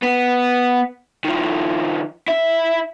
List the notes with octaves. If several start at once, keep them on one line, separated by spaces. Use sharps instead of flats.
B3
D#3 F3
E4 E5